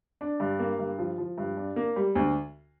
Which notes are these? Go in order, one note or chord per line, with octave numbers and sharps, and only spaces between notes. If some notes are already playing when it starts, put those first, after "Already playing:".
D4
G2
A#3
G2
F3
F3
G2
D4
A#3
G3
D2